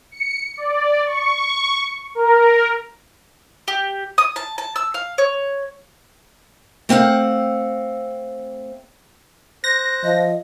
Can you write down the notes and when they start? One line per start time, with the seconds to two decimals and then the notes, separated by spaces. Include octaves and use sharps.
0.11 C#7
0.57 D5
1.06 C#6
2.15 A#4
3.68 G4
4.18 D#6
4.36 A5
4.58 A5
4.76 E6
4.94 F5
5.18 C#5
6.89 A3 C4 F5 F#5
9.64 C5 F#6 A#6
10.04 F3 D#5